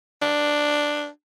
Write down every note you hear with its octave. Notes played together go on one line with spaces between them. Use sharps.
D4